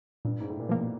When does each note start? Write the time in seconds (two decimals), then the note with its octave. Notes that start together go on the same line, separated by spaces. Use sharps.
0.25 G2 A#2
0.40 G#2
0.50 A2
0.60 A#2
0.69 B2 F3 A#3